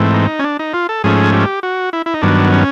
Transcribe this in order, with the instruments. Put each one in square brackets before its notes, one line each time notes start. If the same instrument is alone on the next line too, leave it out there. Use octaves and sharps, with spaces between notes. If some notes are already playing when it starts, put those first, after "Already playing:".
Already playing: [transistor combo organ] G#2 E3 A3 C4
D#4
C#4
D4
D#4
F4
A4
G#2 F3 A3 C#4 G#4
G4
F#4
E4
E4
D#4
G2 D#3 F#3 B3 D4
C#4